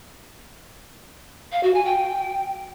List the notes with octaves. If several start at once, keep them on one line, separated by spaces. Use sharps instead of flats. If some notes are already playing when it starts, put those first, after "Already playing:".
F5
F#4
G#5
G5